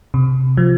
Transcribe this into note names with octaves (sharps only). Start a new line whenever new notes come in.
C3
F3